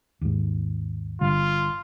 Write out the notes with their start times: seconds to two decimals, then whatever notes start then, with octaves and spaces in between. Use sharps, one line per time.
0.21 D#2 G#2
1.21 G1 D3 G3 F4